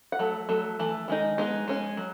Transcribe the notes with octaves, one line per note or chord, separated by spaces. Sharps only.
F#5
F#3 A3
F#3 A3
E3 A3
D#3 G#3 D#4
G#3 B3 D#4
G#3 C#4
F#3